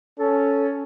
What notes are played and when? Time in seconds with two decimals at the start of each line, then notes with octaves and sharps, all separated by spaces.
0.19 C#4 A4